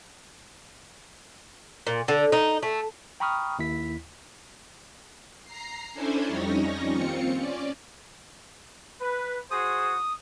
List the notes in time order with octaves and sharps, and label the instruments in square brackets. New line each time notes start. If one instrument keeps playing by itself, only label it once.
[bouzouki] A#2
D3
D#4
A3
[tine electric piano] G5 A#5 B5 C#6 D#6 F6
D#2 E4 B6
[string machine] A#5 C7
C#4 D4 E4 A4 C5 G#5
F2 G3 C#4 D#4 C#5 A#6
D#2 C4 F4 C#7
C#4 D5
[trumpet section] B4
[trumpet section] F#4 G#4 C5 [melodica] D#6